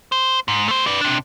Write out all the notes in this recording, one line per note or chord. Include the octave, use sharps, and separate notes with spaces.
C5
G#2
A3 C5
B4 D5
C3 D4